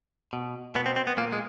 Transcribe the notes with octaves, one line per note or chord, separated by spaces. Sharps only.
B2
B2 B3
C4
C4
B3
A#2 A#3
G#3